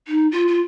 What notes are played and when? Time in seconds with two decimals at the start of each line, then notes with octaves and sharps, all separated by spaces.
0.07 D#4
0.32 F4
0.48 F4